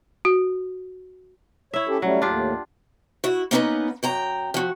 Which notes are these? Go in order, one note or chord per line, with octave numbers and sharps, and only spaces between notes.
F#4
E4 C#5 E5
C#4 G4 A4
F#3 G3 A3 C#4
D#2 A2 D4 F4 G4
E4 F#4
A#3 B3 C#4 D#4 A4 B4
F#2 G5 A#5
F3 F#4